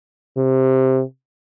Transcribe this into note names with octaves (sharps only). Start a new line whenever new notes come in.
C3